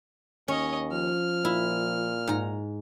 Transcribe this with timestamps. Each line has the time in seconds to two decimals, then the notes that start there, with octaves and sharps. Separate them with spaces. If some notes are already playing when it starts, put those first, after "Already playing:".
0.48 D#2 C#4 C#5 D#5
0.92 F3 F6
1.45 A#2 E4
2.28 G#2 A#5